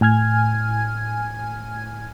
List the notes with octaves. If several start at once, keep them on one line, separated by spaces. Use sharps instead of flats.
A2 G#5 F6 G#6